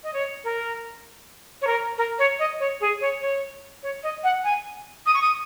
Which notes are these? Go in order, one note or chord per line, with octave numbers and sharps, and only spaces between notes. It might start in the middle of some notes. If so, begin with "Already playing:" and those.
D#5
C#5
A#4
C#5
A#4
A#4
C#5
D#5
C#5
G#4
C#5
C#5
C#5
D#5
F#5
G#5
D#6
C#6
D#6